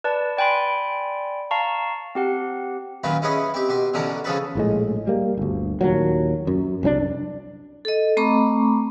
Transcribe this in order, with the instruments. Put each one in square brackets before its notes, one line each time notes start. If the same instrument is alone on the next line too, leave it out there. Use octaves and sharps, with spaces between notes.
[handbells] B4 D5 A5
D5 G5 G#5 B5 C6
F5 A5 A#5 C#6
C4 G4 F#5
[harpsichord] F#2 A#2 D#3 F4 B4 F5
C#4 E4 G#4 B4 C#5 D#5
C4 G4
B2 G4 C6
B2 D3 E3 C#4 D4 A#4
C#3 F3 C#4 G#4 A4 B4
[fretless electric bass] A#1 A2 G#3
G3 A#3
G1 D2
D#2 A#2 F#3
F#2
C2 F#2 C4 D4
[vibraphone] A4 D#5
A3 C4 A#5 B5 C#6 D6